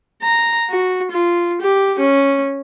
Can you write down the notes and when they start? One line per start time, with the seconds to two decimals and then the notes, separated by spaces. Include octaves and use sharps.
0.23 A#5
0.69 F#4
1.11 F4
1.61 G4
2.00 C#4